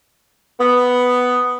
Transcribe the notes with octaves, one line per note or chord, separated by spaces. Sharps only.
B3